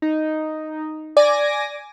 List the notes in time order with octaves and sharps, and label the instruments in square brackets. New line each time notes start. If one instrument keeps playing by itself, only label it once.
[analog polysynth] D#4
[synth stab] D5 [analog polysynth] G#5 D6 A#6